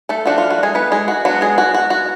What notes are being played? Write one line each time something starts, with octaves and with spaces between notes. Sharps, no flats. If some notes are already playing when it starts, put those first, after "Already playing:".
A3 A4
F3 A3 D4 F#4
F4
F#4
G#3 G#4
B3 B4
G#3 G#4
F#4
F#3 B3 D4 F#4
G#3 G#4
F#4
F#4
F#4